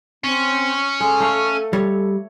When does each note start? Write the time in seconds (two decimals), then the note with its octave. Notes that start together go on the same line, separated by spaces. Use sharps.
0.24 C4 C#4
1.00 G#3 A4
1.20 A3 F5
1.73 G3 C#5